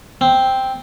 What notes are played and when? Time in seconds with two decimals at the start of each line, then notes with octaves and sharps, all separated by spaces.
0.21 C4